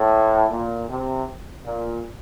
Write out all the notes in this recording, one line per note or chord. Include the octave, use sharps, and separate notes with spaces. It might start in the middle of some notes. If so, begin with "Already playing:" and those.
Already playing: A2
A#2
C3
A#2